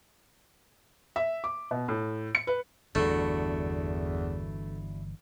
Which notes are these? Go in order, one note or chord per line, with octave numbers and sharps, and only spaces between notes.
E5
D6
B2
A2
C#7
B4
G1 E2 B2 E3 A3 D4 E4 F#4